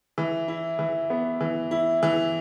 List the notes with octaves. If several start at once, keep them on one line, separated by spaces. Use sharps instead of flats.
E3
E4
E3
B3
E3
E4
E3